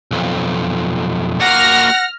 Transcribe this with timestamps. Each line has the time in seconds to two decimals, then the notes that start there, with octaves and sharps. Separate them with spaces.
0.11 B1 F2
1.40 A#3 F#4 F#5 F6 A#6